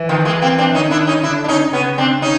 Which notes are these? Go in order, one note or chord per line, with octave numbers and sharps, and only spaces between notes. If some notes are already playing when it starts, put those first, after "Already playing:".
Already playing: E3
D#3 F3
G#3 A#3
A#3 C4
C4 D4
D#3 C#4 D#4
D4 E4
C#4 D#4
D3 D4 E4
D4
C#4 D#4
C#3 B3 C#4
C4 D4
C#4 D#4